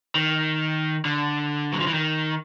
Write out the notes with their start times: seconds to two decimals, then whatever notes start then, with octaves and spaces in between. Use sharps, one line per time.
0.15 D#3
1.05 D3
1.73 F#3
1.79 F3
1.87 E3
1.94 D#3